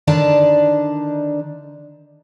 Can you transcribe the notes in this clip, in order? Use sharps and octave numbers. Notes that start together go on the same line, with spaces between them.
D3 D#3 D4 D#4 D5 A5